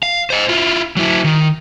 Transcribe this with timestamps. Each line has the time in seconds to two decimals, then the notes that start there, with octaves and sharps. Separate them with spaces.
0.03 F5
0.30 C5 D#5
0.49 E4 F4
0.97 F#3 E4
1.24 D#3